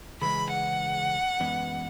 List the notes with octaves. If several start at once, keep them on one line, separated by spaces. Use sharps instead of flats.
C#3 E3 G#3 B5
F#5
F#2 E3 G#3 B3